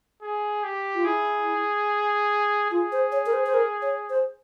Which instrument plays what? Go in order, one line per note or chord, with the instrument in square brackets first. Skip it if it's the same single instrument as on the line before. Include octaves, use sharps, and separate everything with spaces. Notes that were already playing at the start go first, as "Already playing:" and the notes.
[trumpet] G#4
G4
[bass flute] F4
[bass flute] E4 [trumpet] G#4
[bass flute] F4 [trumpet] G#4
[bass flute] C5
C#5
A#4
C5
C5
A#4
C#5
C5